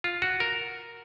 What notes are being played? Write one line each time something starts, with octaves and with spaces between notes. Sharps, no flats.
F4
F#4
A#4